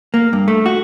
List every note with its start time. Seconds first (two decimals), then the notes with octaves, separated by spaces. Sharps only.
0.14 A#3
0.33 G2
0.48 A3
0.66 F#4